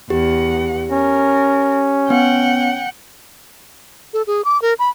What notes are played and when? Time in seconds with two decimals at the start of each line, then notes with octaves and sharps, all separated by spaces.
0.10 E2 G4 F#5
0.91 C#4 A#4
2.10 B3 F#5 G5
4.13 A4
4.27 G#4
4.45 D6
4.62 A#4
4.79 B5